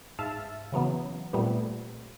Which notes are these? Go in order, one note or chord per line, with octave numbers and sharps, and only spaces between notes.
G#2 E5 F5 A5
C#3 E3 F#3 B3
A#2 G3 A3 B3 C4